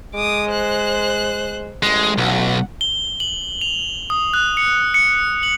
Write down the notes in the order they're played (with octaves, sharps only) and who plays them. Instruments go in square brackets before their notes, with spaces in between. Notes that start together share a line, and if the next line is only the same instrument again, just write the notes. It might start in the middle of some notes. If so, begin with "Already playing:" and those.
[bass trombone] G#3 [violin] D6 D#6
[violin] C5 F#6
[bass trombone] A1 [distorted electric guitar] G#3
[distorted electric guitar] B1 [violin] F#5
[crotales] G7
F#7
F7
D#6
F#6
C#7
C#7
F#7